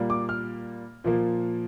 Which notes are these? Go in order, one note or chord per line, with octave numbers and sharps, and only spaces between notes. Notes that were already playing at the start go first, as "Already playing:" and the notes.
Already playing: A#2 G3 A#3
D6
F6
A#2 F3 A#3